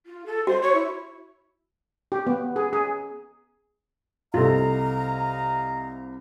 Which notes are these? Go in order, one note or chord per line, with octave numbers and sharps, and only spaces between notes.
F4
A4
F#4 C5
C#5
E4
G4
B3
G#4
G#4
C2 C3 F4 A4 D#5 F5 A#5